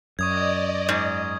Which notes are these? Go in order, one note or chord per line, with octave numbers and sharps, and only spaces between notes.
F#2 D5 D#5 C#6 D#6 G#6
G#2